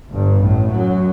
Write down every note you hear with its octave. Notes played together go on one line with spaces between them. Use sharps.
G1 G2
A1 A2
F#2 F#3